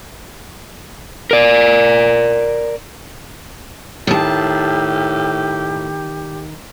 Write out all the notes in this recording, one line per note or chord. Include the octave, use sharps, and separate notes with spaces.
A#4 D5
A2 D#3 G4 A5